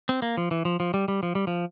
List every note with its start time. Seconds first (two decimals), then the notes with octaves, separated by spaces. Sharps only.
0.09 C4
0.22 A#3
0.37 F3
0.51 E3
0.65 F3
0.80 F3
0.94 G3
1.08 G3
1.23 F3
1.35 G3
1.47 F3